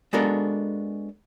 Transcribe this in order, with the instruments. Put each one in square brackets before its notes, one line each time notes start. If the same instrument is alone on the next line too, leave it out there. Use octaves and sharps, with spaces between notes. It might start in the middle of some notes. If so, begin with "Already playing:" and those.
[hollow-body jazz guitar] G#3 B3 D4 F#4 A4 A#4